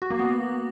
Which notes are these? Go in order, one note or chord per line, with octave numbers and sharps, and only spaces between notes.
F#4
A#3
B3